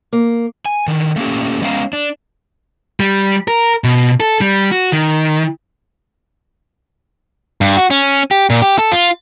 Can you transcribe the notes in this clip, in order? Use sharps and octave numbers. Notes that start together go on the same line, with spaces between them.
A#3
G#5
D3 D#3
A3 A#3 C#4 G4
G#3 B3 C#4 F5 A#5
D4
G3
A#4
B2
A4
G3
F#4
D#3
G2
F#4
C#4
G4
A#2
G4
A4
F4